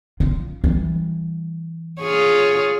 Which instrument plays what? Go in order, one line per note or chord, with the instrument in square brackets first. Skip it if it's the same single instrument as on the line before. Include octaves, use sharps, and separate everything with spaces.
[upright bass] F4
E3 G3
[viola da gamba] F4 G#4 C#5